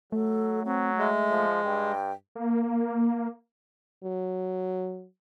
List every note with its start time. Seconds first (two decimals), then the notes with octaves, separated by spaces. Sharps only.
0.12 F#3 A3 A4
0.65 F#3 C4
0.98 G#3 E5
1.30 F3
1.64 G2 G5
2.35 A#3
4.04 F#3